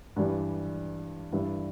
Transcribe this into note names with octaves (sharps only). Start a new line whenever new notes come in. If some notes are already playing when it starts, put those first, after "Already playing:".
G2 E3 G3
G2 E3 G3 E4